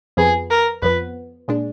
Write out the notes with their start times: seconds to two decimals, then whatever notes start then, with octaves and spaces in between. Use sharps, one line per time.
0.17 F2 F3 B3 G#4
0.50 A#4
0.82 F2 F3 B3 B4
1.48 A#2 G#3 D4